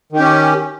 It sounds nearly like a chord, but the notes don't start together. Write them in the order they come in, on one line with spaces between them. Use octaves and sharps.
D#3 G4 C#4